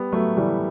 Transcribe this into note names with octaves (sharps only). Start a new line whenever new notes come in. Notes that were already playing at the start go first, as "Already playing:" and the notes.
Already playing: G3 B3
F#3 A3
E3 G3